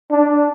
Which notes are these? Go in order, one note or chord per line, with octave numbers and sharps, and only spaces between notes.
D4